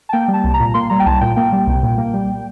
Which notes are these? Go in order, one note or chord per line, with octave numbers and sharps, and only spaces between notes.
A5
A#3 G5
G3
A5
C2
A#5
A#2
A#3 C6
G3 A#5
G5
C2 A5
A#2 G5
A#3 G5
G3
C2
A#2
A#3
G3